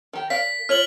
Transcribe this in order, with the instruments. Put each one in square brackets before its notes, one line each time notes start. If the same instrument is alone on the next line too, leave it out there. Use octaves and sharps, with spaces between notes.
[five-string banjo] D#3 G4
[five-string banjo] A#4 D5 F5 [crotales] B6
[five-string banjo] F4 C#5 [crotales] F6 F#7